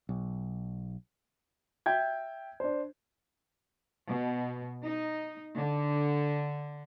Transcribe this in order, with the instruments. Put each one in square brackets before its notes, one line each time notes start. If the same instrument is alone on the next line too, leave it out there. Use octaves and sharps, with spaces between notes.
[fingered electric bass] B1
[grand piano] E5 G5 G6 G#6
D4 C5
[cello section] B2
D#4
D3